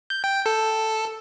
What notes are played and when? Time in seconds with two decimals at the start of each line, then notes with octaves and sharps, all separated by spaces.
0.10 G6
0.24 G5
0.46 A4